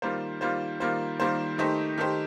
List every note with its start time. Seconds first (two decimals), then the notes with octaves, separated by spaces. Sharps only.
0.02 D#3 G3 A#3 F4 C5
0.41 D#3 G3 A#3 F4 C5
0.80 D#3 G3 A#3 F4 C5
1.20 D#3 G3 A#3 F4 C5
1.58 D#3 A3 D#4 G4 C5
1.98 D#3 A3 D#4 G4 C5